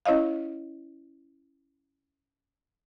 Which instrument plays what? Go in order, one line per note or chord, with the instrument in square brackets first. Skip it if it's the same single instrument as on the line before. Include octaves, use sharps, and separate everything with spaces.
[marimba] C#4 E4 C#5 D#5 F5